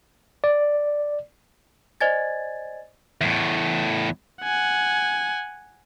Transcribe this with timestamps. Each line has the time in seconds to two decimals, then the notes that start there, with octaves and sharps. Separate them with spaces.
0.44 D5
2.01 C5 D5 D#5 G#5 G#6 A6
3.21 E2 A2
4.43 F#5 G#5